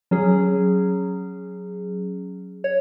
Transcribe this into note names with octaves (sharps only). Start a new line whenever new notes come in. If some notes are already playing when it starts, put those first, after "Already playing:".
F#3 C#4 G#4
C#5